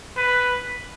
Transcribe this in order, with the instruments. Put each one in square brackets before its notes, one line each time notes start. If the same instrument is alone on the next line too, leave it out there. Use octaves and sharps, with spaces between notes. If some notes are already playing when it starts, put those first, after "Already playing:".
[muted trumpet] B4